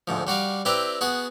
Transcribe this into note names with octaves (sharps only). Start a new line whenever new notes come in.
D2 G#2 F3
G3 F#4 D5 F5
C4 E4 G4 B4 D5 A#5
B3 F#4 G#4 F#5